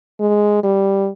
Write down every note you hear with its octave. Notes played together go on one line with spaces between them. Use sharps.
G#3
G3